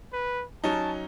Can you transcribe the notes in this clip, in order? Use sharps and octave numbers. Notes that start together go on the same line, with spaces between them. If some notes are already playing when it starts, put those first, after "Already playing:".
B4
F#3 C#4 D#4 A5